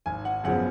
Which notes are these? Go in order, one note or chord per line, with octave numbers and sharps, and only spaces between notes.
G#1 G#5
F#5
F#2 C#3 F3 B3 F#5